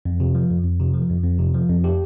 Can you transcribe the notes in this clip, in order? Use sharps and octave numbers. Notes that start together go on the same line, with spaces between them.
F2
C3
F3
F2
F2
C3
F3
F2
F2
C3
F3
F2
G4